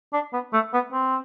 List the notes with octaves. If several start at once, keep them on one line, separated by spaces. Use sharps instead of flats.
D4
B3
A3
B3
C4